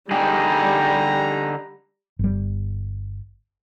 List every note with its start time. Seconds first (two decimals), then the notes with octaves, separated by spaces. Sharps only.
0.11 D3 G3 D#4 G#4 G5 A#5
2.19 G1 G3